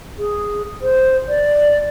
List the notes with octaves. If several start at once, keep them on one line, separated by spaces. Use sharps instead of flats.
G#4
C5
D5